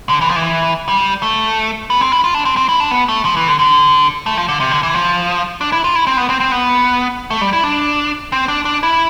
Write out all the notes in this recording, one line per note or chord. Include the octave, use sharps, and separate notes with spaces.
D3
E3
F3
E3
G3
A3
B3
C4
E4
F4
D4
C4
C4
E4
D4
B3
A3
F3
E3
D3
D3
A3
F3
D3
C3
D3
E3
F3
D4
E4
F4
E4
C4
B3
C4
C4
B3
A3
G3
E4
D4
C4
D4
D4
E4